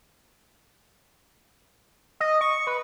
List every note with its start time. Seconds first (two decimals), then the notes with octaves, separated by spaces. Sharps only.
2.20 D#5
2.41 C#6
2.67 B4